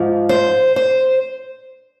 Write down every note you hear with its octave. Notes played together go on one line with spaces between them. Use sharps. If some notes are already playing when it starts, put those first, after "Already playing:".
Already playing: G#2 F3
C5
C5